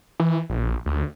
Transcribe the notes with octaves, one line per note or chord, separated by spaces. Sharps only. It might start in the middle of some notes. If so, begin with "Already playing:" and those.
E3
A#1
D2